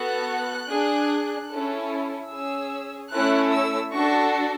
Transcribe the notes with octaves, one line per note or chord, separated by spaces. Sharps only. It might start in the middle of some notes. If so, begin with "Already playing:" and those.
Already playing: B3 F#4 A4 F#6
D4 G#4
C#4 E4 A4
C#4 G#4 E6
A3 C#4 E4 A4 F#6
E6
D4 F#4 A4 C#6